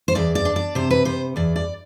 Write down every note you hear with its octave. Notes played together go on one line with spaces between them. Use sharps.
C5
E2 D5
D5
D4
D5
C3 C5
B4
C3 C5
E2 D5
D5